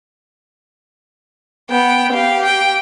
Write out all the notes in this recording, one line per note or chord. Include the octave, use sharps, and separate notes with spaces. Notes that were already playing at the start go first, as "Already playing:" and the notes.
B3 G5
G4 F5
G5